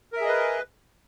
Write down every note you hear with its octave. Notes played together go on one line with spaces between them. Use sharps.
G#4 A#4 B4 D#5 E5